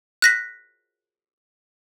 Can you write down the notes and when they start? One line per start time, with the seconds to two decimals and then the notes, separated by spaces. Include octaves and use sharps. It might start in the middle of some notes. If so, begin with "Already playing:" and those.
0.22 F#6 A#6 B6